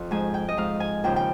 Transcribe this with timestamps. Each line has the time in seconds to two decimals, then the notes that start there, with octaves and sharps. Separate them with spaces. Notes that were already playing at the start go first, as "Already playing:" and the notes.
Already playing: F2 F5
0.11 G#2 F3 G#5
0.34 G5
0.49 D#5
0.57 G#2 F3 F5
0.80 G#5
1.04 D#2 C#3 F3 G5
1.16 G5